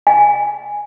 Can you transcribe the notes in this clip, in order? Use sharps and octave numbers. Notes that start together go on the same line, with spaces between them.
G#5